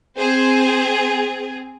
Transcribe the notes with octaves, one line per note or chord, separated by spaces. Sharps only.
C4 G#4 C5